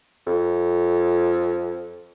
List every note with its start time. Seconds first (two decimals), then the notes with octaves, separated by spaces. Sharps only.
0.26 F2